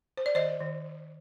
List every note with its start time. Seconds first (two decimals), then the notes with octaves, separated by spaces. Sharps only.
0.17 C5
0.26 D5
0.35 D#3 C5 D#5
0.60 D#3